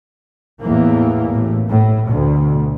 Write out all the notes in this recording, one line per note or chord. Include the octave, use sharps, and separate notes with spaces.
E2 A2 E3 A#3
A1 A2
A2
D2 B2